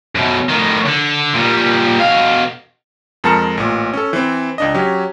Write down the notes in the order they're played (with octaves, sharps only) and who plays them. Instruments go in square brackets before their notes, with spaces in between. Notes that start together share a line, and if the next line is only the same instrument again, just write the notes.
[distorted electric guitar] F#2 B2
A2 D#3
D3
A#2 G3
B2 F5
[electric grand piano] F2 G#3 A#4 A5 A#5 C#7
A1 A#2
C#4 A4
E3 C4
C#2 D4 D#5
F#3 C#4 G4